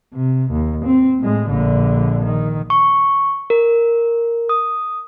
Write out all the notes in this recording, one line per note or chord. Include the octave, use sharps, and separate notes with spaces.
C3
D#2
C4
A2 G#3
A#1 D3
D#3
C#6
A#4
D#6